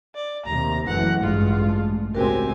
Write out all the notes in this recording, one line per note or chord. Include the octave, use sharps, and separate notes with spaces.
D5
D#2 C3 A#5
F#1 E3 A3 F#5
A1 G2 G#3 F4
A3
C#2 A2 C4 F#4 G4 A#4 G#5